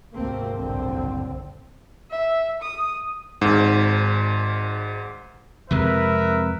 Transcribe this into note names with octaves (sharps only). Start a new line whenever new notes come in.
G#1 D2 C3 A3 A#3 C4
F#1 C2 F2 A2 D3 C4
E5
D#6
G#1 G#2
F2 C3 G#3 A#4 B4 E5